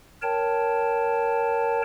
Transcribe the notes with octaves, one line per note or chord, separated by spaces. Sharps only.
A#4 C#5 G5 A5